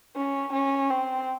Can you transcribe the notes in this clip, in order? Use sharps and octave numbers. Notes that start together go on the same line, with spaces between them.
C#4
C#4
C4